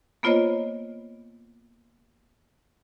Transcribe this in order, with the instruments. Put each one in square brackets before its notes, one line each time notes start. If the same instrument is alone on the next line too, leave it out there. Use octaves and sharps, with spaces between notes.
[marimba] A#3 B3 F4 C5 C#5 D#5